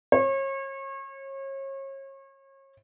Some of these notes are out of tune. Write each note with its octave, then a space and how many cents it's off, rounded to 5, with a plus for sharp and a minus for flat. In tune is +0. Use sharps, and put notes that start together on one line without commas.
C#5 -35